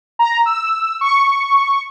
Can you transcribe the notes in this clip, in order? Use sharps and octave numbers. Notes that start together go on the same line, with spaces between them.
A#5
E6
C#6